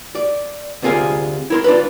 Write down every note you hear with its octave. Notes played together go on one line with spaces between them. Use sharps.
D5
D2 C3 F4 G#4 A#4 F5
E4 A#4 C6
D4 F4 B4